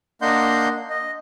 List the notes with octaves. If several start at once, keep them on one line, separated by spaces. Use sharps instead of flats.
A#3 D4 D#5 F#5 C6 G6
D#5